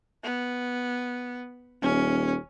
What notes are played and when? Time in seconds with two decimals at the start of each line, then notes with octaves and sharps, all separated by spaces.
0.24 B3
1.82 D#1 C#4